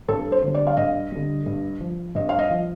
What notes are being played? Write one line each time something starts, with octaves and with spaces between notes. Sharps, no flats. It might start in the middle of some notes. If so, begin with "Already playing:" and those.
G2 A4
C5
D3
G3
D5
F5
G2 D#5
D3 G3
G2
F3
G2 D#5
F5
D#5
F3